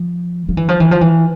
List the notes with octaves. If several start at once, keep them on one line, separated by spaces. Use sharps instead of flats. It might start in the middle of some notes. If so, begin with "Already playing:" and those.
Already playing: F3
F3
E3
F3
E3
F3
E3